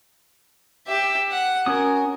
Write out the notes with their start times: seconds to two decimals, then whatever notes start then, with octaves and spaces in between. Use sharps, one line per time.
0.88 G4 E5
1.32 F#5
1.66 C#4 F#4 A#4 D#6